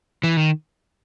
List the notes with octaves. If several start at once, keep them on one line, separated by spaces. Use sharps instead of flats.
E3
D#3